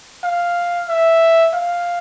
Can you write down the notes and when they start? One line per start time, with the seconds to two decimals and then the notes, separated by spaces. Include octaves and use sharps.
0.24 F5
0.89 E5
1.53 F5